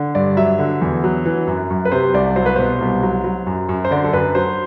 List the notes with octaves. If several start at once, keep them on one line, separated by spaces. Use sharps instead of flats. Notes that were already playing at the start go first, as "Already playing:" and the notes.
Already playing: D3
G2 D5
F#3 E5
D3
E2
F#3
E3
F#2
F#2
B4
C3 C5
C2 D5
F#3 C5
B4
B2 C5
C2
F#3
F#3
F#2
F#2
C5
D3 D5
A4
F#2 B4
F#3 C5